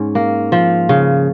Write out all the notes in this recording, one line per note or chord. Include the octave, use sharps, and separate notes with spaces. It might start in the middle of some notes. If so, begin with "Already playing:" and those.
Already playing: G#2 C#4
A#3
F3
C#3